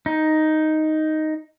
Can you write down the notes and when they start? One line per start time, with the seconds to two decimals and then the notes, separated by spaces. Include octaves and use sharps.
0.06 D#4